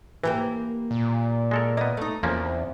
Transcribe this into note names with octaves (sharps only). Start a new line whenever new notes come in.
E3 A#3 G4 B4
A#2
G#3 A4 A#4
A#3 B3 D#5
A3 D#4
E2 C3 F3 A#3 C#4